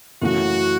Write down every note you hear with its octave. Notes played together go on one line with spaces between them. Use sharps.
F#2 C#3 E3 A3 F#4